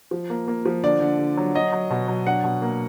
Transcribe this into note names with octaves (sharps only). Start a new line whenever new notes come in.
F3
A#3
A#3
F3
D3 D5
D3
D3
F#3
F#3 D#5
F#3
B2
F#3
D4 F#5
B2
A#3